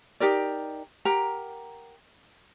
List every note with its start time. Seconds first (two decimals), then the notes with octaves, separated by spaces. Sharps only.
0.20 D#4 G4 A#4 D5
1.05 G4 A#4 F#5 A#5